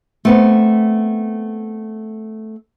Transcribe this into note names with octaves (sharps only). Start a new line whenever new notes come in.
A3 B3 C4